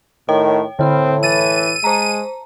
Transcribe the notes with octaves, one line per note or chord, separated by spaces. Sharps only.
A2 D#3 C#5 G5
A2 D3 C4 E4 B5
E3 E6 A6 D#7
G#3 C5 A5 A#5